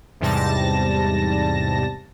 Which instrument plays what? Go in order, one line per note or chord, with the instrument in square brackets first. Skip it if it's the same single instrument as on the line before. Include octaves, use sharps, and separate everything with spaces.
[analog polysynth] E2 G#2 C3 G3 A5 A#6